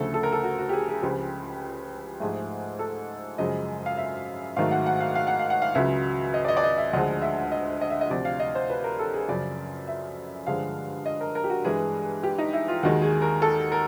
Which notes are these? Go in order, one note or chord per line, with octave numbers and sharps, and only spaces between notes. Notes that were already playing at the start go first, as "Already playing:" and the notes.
Already playing: D2 C#3 F3 A3 A4
A4
A#4
A4
F#4
F#4
G4
G#4
G#4
C#2 C#3 F3 G4
G#2 F3 A3 G#4
A4
F#2 C#3 F3 G#3 D#5
F5
E5
G#2 D#3 F#3 A3 F5
F#5
F#5
F5
F5
F#5
F5
F#5
F5
C#2 C#3 F#3 E5
D#5
D5
D#5
D5
D#5
E5
D2 D3 F3 G#3 D#5
E5
D#5
D#5
E5
D#5
D2 C3 F3 D5
F5
D#5
C5
B4
A#4
A4
G#4
F#2 C#3 F3 D5
E5
G2 D3 F3 G#3 F5
D#5
A#4
A#4
G4
F#4
G2 E3 G#3 G#4
G4
D#4
E4
F4
D#2 D#3 G#3 F#4
G#4
A#4
A4
A#4